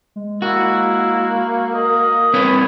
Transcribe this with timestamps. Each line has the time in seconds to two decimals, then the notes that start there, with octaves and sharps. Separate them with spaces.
0.16 G#3
0.42 A#3 E4 F#4
1.73 A#4 D#5
2.34 C4 B4 C#5 B5 G#6